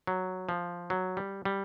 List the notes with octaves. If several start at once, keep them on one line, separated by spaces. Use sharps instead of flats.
F#3
F3
F#3
G3
G3